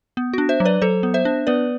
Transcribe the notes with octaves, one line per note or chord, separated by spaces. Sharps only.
B3
D4 F#4
C5 E5
F#3
B4 D5
F#3 A4 C5
B3
C5 E5
D4
B3 B4 D5